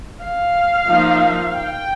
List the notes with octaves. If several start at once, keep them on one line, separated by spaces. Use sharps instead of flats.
F5
F3 A#3 D#4
G5